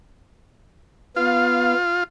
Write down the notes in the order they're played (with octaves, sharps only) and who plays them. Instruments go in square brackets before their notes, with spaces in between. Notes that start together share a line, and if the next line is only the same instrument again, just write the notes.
[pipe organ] B3 F5 [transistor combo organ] F4